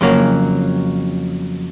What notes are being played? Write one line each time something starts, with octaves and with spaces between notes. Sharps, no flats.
F2 C#3 F#3 A#3